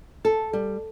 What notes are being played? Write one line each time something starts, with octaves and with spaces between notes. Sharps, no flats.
A4
G3